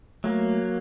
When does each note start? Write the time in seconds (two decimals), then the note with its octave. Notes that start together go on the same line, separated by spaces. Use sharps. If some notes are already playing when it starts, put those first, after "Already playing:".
0.24 F#3 A3 A#3